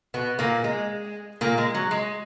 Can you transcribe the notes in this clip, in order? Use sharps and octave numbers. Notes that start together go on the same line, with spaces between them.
B2 B3
A#2 A#3
G#3
A#2 A#3
G#3
F#3
G#3